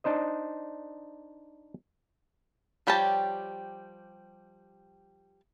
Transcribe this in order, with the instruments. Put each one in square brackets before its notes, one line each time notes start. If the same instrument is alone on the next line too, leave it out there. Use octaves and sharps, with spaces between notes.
[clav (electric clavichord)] D4 D#4 C5 D#5
[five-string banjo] F3 G3 G4 C#5 A5